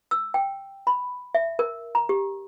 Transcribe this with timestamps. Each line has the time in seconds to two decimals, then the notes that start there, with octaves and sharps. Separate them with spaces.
0.11 E6
0.34 G5
0.87 B5
1.35 E5
1.59 A#4
1.95 A#5
2.09 G4